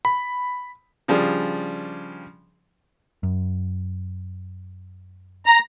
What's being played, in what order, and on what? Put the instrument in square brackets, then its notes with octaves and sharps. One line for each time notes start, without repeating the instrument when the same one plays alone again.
[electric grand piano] B5
[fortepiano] C#3 F3 G3 D4 G#4
[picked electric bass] F#2
[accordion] A#5